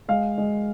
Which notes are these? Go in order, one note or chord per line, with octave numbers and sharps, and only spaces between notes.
G#3 F5
G#3